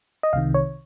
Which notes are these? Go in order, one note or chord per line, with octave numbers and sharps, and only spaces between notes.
D#5
C2 C3 D#3 F5
C#5